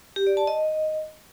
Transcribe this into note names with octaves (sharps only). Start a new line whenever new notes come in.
G4
D5
A5
D#5